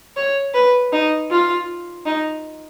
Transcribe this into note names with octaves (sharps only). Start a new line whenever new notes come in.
C#5
B4
D#4
F4
D#4